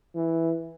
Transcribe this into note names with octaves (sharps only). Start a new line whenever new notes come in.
E3